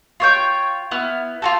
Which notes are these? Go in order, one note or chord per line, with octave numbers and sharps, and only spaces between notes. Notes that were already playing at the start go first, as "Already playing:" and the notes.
F4 C#5 G5
B3 E4 F6
F4 F#4 A4